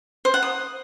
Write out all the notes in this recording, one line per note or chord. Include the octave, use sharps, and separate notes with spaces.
C5
F#5
D#6